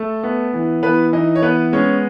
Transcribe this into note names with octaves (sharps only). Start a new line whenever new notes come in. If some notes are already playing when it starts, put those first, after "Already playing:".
Already playing: A3 A4
B3
E3
E3 B3 B4
E3 D#4 D#5
C#5
B3 B4
G#3 C#4 C#5